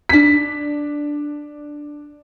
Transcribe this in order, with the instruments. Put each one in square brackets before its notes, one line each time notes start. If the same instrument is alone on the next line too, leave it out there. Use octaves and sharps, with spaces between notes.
[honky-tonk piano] D4 B6